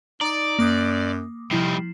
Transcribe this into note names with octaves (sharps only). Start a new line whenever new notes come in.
D#4 D5 A#5 D6
F#2 A#3 D6 D#6
C3 F3 G3 D#4 E4 C7